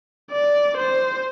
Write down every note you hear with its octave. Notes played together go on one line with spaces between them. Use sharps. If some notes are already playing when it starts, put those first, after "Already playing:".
D5
C5